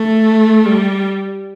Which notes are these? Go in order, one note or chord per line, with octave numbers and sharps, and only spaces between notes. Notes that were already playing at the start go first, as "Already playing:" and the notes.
Already playing: A3
G3